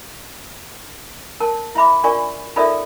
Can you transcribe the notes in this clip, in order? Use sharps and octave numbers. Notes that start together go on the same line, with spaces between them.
A#4 A5
E4 E5 B5 D6
D4 F4 A#4 D5 G#5 C#6
D#4 F4 A4 A#4 D5 E5